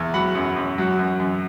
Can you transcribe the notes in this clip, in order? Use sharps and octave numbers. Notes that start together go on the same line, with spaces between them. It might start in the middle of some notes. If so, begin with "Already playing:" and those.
Already playing: E2
F#3 F#5 B5
F#2
F#2
F#3
F#2
F#2